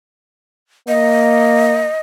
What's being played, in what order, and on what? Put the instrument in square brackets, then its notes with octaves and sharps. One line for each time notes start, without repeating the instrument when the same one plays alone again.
[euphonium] A#3 [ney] D#5